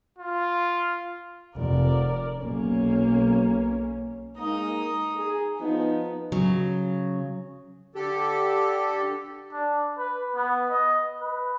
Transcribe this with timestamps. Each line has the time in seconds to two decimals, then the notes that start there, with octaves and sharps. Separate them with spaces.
0.18 F4
1.57 F1 A#4 D5
2.40 B1 A#3 C#4
4.38 G#3 A#3 D#4 D#6
5.16 G#4
5.59 F3 B3 D#4
6.32 C#3 F#3
7.95 D3 G4 A4
9.53 D4
9.98 B4
10.36 B3
10.71 D#5
11.21 B4